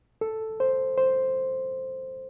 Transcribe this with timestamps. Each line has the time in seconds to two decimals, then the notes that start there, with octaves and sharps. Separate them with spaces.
0.21 A4
0.60 C5
0.98 C5